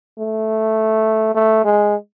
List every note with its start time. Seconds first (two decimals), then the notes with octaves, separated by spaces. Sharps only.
0.19 A3
1.35 A3
1.64 G#3